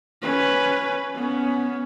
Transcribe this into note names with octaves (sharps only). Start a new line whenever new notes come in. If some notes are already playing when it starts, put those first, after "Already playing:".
C#4 B4
B3 C#4